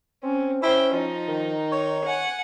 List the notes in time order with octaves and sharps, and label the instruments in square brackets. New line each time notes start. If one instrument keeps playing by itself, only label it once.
[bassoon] C4 [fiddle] C#4
[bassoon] C#4 [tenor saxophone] E4 [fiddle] C5 G5
[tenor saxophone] F3 [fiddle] D#4
[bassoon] D#3
[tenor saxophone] C#5
[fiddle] F#5 G#5